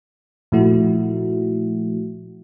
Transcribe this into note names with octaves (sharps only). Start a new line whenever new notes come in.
A#2 F3 A3 E4 F#4